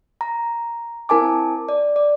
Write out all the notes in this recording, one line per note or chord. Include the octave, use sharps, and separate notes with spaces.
A#5
C4 E4 A#4 G#5 A5 D6
D5
D5